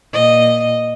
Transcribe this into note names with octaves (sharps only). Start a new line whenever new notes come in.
A#2 D#5